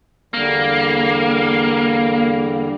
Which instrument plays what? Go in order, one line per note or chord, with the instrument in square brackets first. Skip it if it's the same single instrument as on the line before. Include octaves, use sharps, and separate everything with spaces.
[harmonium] E2 D3 G3 [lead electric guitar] A#3